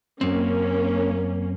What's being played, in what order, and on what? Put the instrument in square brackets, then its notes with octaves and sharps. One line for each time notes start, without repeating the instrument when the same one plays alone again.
[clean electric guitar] F#2 C4 [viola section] A#3 C#4